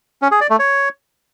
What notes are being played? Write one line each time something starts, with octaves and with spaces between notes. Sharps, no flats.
C#4
G#4
D5
A3
C#5